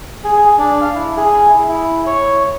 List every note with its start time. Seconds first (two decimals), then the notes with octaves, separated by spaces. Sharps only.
0.24 G#4
0.38 G#4
0.58 D4
0.81 F5
0.95 E4
1.17 G#4
1.49 E4
1.69 E4
2.07 C#5